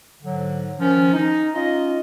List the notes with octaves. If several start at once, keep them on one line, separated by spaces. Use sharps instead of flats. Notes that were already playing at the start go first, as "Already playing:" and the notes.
G#2 D3 F#3
D#3 F3 C#4
D#4
C#4 F4 D#5